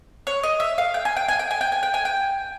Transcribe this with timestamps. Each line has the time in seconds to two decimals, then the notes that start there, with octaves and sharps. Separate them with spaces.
0.27 C#5
0.43 D#5
0.60 E5
0.78 F5
0.94 G5
1.05 G#5
1.16 G5
1.28 G#5
1.39 G5
1.51 G#5
1.61 G5
1.72 G#5
1.83 G5
1.94 G#5
2.05 G5